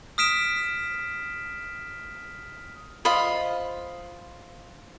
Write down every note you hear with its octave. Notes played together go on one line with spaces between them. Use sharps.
D#6 F6 B6 D7 E7
F4 C5 D#5 B5